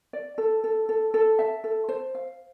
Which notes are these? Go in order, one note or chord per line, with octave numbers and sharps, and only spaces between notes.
D5
A4
A4
A4
A4
E5
A4
C5
F5